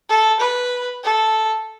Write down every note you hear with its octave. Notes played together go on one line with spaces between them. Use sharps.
A4
B4
A4